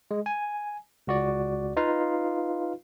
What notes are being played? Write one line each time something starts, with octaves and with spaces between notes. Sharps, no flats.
G#3
G#5
C#2 F#4 D5
D#4 F4 B4 F5